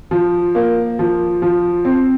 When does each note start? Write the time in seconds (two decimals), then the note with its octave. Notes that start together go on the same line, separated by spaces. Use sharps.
0.11 F3
0.55 A#3
0.99 F3
1.42 F3
1.85 C4